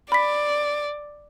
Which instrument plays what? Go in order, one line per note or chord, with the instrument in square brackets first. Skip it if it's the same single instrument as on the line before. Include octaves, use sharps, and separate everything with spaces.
[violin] D5 [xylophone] B5 B6